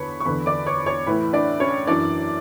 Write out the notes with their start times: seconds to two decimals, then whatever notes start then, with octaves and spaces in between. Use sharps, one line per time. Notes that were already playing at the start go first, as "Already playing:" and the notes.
Already playing: E2 D3 B4 C#5 B5
0.20 C#6
0.26 E2 D3 B4 B5
0.46 D5 D6
0.66 C#5 C#6
0.86 C#5 C#6
1.07 A2 E3 B4 B5
1.33 D4 D5
1.60 C#4 C#5
1.87 F#2 E3 D4 D5